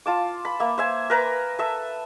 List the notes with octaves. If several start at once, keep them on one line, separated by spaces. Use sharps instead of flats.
F4 A5 D6
B5
A#3 E5
C5 E5 G#5
A#4 B4 A#5
A4 E5 E6